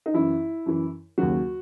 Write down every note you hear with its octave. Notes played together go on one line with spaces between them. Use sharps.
D#4
F#2 E3 E4
F#2 E3
D#2 C#3 F#3 F#4